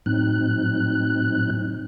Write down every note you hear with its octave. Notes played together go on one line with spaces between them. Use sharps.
A2 F#3 C4 D#4 F#6